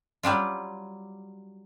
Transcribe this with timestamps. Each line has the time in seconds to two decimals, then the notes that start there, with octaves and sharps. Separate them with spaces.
0.23 F#3 G3 D4 F4